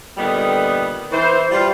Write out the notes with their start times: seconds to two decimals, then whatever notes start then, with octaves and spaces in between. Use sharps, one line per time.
0.17 A#2 D3 D#3 G3 B3
1.12 E3 C5
1.51 G3 F4